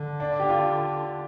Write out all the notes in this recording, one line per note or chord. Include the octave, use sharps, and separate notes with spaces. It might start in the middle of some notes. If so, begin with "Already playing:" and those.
Already playing: D3
D4
G4
F4